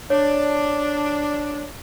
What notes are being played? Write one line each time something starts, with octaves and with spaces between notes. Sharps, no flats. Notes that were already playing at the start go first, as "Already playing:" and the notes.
D4 C#5